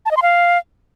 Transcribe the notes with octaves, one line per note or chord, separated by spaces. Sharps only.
A5
D#5
C6
F5